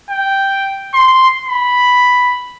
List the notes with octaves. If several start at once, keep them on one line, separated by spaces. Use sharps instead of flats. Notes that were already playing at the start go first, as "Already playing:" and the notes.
G5
C6
B5